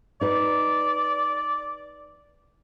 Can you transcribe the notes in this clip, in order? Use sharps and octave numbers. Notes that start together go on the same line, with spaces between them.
D#4 B4 D5